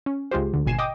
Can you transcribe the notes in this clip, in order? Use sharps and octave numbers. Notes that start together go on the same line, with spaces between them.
C#4
C#2 G#3 F4 G4 C5
D2 D3
G#1 B2 G#5 C7 E7
D#5 G5 D6 D#6